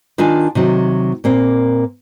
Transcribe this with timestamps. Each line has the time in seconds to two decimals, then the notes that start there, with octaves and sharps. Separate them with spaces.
0.18 D#3 D4 F4 G#5
0.55 C3 D#3 F#3
1.24 A#2 A#3 C4